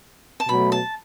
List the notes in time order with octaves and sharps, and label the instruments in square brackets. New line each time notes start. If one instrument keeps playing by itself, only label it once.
[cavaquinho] A5
[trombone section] B2 F#3 A3 [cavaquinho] B5
[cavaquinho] A5